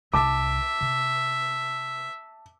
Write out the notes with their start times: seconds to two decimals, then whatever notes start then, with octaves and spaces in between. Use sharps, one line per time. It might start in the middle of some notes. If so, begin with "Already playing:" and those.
0.13 C2 D#4 E5 A5 D6
0.81 C3